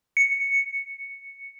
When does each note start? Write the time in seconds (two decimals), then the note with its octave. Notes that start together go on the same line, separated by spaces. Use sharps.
0.17 C#7